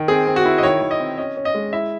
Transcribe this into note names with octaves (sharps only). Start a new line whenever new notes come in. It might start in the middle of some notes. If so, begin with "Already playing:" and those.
Already playing: D#3
C4 G#4
C4
F#4
E4
D#5
D#3 C#5
D#3
D#5
C4
C#4 D#5
C#4
D#5
G#3
E4 E5